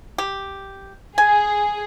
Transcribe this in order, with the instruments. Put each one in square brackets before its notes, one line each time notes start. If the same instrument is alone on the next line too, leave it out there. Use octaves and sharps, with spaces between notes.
[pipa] G4
[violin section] G#4 [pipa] G#5